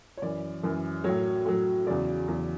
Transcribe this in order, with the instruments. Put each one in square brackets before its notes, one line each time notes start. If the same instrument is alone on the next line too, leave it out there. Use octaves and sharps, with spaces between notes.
[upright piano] C#5
F#2 E3 D5
F#2 E3
A2 F#3 C#5
A2 F#3
E2 C#3 F#3 D5
E2 C#3 F#3